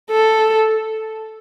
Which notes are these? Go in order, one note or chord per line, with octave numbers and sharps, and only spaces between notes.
A4